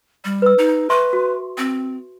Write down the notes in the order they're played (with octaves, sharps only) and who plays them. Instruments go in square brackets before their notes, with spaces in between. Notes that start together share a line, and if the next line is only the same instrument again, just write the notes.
[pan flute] G3
[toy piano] B4 E6
[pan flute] D#4
[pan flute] B4 [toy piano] E5 C6 C#6
[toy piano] F#4
[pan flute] C4